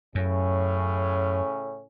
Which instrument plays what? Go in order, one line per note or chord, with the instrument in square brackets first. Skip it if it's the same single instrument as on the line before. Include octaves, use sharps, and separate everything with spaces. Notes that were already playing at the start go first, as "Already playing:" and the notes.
[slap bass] F#2 [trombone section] A2 C#3 C#4